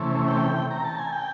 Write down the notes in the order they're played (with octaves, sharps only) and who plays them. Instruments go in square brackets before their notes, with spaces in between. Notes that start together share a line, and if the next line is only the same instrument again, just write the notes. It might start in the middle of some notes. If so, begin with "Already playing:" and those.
Already playing: [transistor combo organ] C3 E3 A3 C#4
G5
A#5
A5
G#5
G5